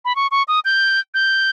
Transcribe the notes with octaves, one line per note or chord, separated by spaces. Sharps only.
B5
C#6
C#6
D#6
G6
G6